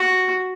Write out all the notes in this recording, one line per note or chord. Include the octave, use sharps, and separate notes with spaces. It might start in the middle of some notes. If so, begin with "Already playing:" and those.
Already playing: F#4